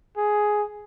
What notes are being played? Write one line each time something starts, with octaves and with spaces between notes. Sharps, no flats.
G#4